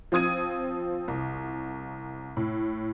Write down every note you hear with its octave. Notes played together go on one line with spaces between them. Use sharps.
F3 C4 D#6 G#6 D#7
C2
A2